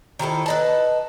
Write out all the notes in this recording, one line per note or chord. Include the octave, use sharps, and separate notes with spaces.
D#3 F3 E4 A4
B4 D#5 A5